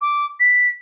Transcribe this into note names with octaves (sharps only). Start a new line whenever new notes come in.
D6
B6